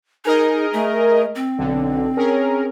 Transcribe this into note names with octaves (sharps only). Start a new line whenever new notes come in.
D#4 G#4 A#4 D#5
A3
C4
B1 D3
C#4 G#4 A#4